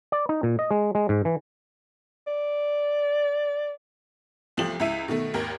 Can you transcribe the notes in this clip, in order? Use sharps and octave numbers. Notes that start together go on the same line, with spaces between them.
D5
D#4
A#2
D#5
G#3
G#3
G#2
E3
D5
C2 F3 A3 G4 F#7
C#2 E4 E5 D#7
B2 D#3 A3
G#1 D#2 A#4